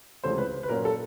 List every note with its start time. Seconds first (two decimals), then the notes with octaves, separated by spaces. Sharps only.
0.24 C#2 C3 E3 A3 C#4 C5
0.38 B4
0.63 B4
0.69 A#2 F#3 A#3 C#4 A#4
0.85 A4